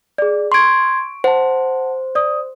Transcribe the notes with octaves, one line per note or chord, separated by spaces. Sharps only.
G#4 D5
C6 C#6 G#6 D7
C5 F#5 A5
D5 D#6